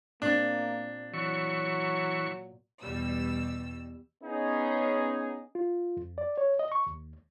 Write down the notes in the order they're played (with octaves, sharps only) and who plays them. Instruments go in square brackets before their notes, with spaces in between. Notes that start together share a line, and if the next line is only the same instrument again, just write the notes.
[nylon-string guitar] A#2 C4 [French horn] A#3 [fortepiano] D4
[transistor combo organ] E3 C#6 [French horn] F#3
[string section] E2 B2 G3 E6
[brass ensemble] B3 C#4 D#4 G#4
[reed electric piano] F4
F2
D5
C#5
D#5
C#6
D#2